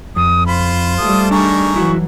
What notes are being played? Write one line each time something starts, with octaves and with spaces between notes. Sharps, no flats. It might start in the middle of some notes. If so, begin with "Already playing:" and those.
F2 D#6
F4 C5 B5
G3 A3 D#6
D#3 D4 G#4 A#5 C#6
E3 F#3 E4 F#4